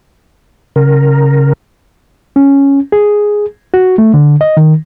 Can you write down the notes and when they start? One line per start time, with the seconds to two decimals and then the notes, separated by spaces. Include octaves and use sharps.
0.76 C#3 A#4
2.36 C#4
2.92 G#4
3.74 F#4
3.98 A3
4.14 D3
4.41 D#5
4.57 D#3